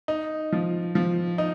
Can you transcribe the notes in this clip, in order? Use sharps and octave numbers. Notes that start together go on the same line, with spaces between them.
D#4
F3
F3
D#4